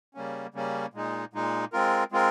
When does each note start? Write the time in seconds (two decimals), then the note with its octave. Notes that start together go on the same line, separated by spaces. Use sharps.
0.15 C#3 G3 A#3 C#4
0.54 C#3 G3 A#3 C#4
0.94 A#2 G#3 D#4
1.33 A#2 G#3 D#4
1.73 G#3 C4 F4 A#4
2.12 G#3 C4 F4 A#4